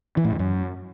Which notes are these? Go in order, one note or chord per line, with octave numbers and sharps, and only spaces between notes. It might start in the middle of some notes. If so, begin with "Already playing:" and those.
E3
A2
E2
F#2